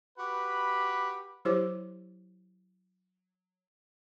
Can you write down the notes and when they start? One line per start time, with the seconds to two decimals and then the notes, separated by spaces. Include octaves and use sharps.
0.18 F#4 G4 B4 B5
1.45 F#3 E4 G4 C5 C#5 D6